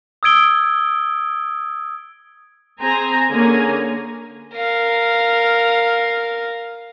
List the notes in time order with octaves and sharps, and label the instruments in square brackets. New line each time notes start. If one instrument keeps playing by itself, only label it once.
[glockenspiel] D#6 E6 G#6 D7 G7
[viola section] C4 G#4 C5 G#5 A#5
D3 A#3 C#4 G#4 G#5 A#5
[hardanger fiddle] A#4 F5